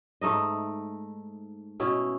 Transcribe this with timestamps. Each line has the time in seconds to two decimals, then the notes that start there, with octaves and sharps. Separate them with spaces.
0.21 G#2 A3 D#4 D#5
1.80 B2 C#4 E4